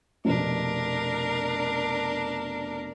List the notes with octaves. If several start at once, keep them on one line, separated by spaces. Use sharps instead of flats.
F1 B2 D4 A#4